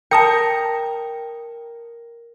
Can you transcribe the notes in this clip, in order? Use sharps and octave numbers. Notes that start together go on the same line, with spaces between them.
A#4 G5 A5 D#6 C#7